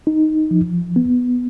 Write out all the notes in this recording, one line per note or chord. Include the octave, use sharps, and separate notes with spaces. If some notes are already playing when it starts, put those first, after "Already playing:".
D#4
F3
B3